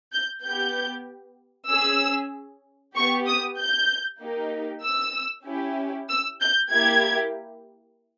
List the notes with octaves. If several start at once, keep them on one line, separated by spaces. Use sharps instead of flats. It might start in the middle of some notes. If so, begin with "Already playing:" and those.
G6
B3 G4 G6
C#4 G#4 E6
B3 G4 C#6
D#6
G6
A#3 D#4 G4
E6
C#4 E4 G4
E6
G6
A#3 E4 G4 G#6